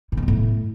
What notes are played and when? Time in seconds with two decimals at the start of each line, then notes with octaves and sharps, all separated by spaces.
0.12 A2
0.17 D#3
0.23 A#2
0.28 A2